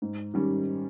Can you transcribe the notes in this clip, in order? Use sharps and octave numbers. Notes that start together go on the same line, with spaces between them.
G#2
D#3 G3 C#4